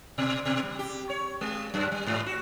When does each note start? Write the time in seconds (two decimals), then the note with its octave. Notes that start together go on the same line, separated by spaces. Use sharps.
0.18 B2
0.45 B2
0.63 G3
0.79 G4
1.10 C#5
1.41 G#3
1.74 F#2
1.92 G3
2.06 G#2
2.26 F#4